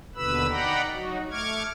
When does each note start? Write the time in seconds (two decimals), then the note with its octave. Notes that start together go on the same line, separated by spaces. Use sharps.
0.15 D#2 B2 D3 B4 B5 E6
0.49 D#4 D5 F#5 G5 A#5 B5
0.93 F#3 D#4 F#4
1.31 A3 C#6 D6 F6 G#6